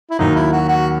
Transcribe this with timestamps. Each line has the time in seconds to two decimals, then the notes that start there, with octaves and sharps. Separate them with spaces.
0.11 E4
0.19 D#2 D#3 F#3 D#4
0.36 E4
0.53 F#4
0.69 F#4